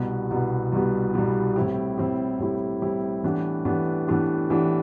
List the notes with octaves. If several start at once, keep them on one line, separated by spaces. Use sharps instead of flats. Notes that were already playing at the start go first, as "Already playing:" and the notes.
Already playing: C2 B2 G3 B3
C2 B2 G3 B3
C2 B2 G3 B3
C2 B2 G3 B3
A2 G3 C4 E4 G4
A2 G3 C4 E4 G4
A2 G3 C4 E4 G4
A2 G3 C4 E4 G4
A2 E3 B3 D4 G4
A2 E3 B3 D4 G4
A2 E3 B3 D4 G4
A2 E3 B3 D4 G4